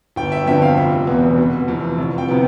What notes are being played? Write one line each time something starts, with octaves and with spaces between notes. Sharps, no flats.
G1 G5
E5
F2 D3 F3 B3 E5
F5
F1 E5
E2 B2 B3
F1
F2 E3
C2
G5
C3 F3 B3